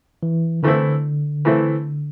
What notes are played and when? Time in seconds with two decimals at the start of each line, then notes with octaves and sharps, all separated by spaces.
0.23 E3
0.63 D3 E3 A3 C4 E4
1.45 E3 A3 C4 E4